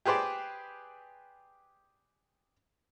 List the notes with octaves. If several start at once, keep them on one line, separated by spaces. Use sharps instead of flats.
G4 G#4 B4 C5 D5